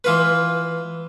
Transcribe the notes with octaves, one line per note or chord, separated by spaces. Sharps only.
E3 F4 B4